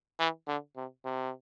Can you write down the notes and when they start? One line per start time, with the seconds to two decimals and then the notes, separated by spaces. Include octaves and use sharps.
0.19 E3
0.48 D3
0.77 C3
1.05 C3